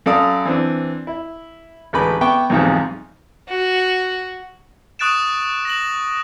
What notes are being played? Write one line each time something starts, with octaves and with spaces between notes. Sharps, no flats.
F#2 A4 D5 F5 D#6
E3 C4 D4
E4
A1 D2 G#3 B4 B5 D6
B3 E5 G5 C#6 D6
B1 E2 G#2 C3 F3
F#4
C#6 D#6 F#6 A6 D7 E7
A#6 E7 F#7